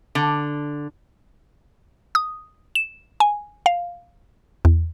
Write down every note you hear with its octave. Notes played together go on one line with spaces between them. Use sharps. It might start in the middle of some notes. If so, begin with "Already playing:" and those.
D3
D#6
E7
G#5
F5
E2